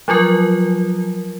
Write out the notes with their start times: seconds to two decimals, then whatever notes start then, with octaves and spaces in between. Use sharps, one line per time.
0.08 F3 F#3 F4 A#4